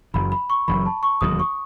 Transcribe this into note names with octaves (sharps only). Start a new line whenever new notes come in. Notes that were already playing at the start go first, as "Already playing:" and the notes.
F#1 F#2 E3 B5
B5
C#6
F#1 F#2 E3 B5
A5
C#6
E1 D#2 D#3 F#3 D#6
C#6